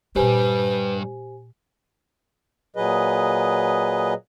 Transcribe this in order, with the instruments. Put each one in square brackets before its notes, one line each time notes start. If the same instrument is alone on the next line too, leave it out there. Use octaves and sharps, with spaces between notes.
[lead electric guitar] G2 G3 [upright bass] A#2 E4 [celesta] G4 C5 G#5 [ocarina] B4
[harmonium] A#2 F#3 G#4 B4 D#5